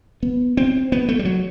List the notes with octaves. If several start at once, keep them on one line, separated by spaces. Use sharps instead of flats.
B3
C4
B3
A3
G3
F#3